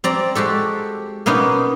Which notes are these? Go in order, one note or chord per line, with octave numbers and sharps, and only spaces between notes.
C4 D5 A#5
G#3 F#4 G4 A4
B2 A#3 B3 C#4 D#4